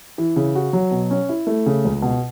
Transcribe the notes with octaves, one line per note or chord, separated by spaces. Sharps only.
E3
C#3
F#4
F#3
B2
C#4
E4
A3
C#3
C#2
B2